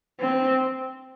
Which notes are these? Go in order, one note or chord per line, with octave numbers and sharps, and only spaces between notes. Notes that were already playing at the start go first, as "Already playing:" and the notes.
C4